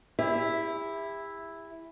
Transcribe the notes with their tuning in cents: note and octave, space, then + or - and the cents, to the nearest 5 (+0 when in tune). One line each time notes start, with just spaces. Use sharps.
E4 +0 G4 +45 E5 +0